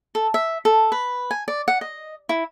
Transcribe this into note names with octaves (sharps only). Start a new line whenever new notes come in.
A4
E5
A4
B4
G#5
D5
F#5
D#5
E4